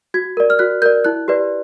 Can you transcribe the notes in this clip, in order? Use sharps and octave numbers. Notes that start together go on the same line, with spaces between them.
F#4 G#6
A#4 D5
F6
F#4 F#6
A#4 D5 G6
E4 F#6
G4 B4 D5